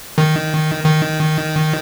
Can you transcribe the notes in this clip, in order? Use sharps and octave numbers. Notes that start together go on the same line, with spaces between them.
D#3
D#3